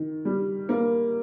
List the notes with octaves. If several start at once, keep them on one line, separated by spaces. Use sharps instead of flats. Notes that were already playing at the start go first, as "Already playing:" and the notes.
Already playing: D#3
G3
A#3